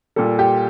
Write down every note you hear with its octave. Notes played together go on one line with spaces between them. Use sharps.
A#2 G3 A4
G4